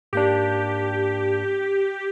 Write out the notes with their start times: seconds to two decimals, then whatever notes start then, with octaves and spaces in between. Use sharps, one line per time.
0.13 G#2 A#3 D4 G4